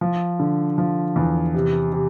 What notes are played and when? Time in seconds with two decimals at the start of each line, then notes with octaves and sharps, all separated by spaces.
0.01 F3
0.40 D3
0.78 F3
1.16 E2
1.54 C3
1.92 C3